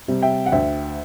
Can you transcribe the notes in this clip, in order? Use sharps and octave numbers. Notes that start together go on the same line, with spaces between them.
C3 G3
E5 G5
F#5
D2 E5 G5